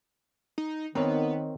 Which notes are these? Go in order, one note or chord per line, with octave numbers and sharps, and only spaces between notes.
D#4
D#3 B3 C4 A#4 C#5